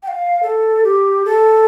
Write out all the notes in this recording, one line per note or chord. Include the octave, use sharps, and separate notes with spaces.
G5
F5
A4
G4
A4